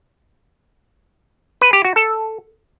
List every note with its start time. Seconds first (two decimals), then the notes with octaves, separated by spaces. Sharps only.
1.61 B4
1.73 G4
1.85 F#4
1.96 A4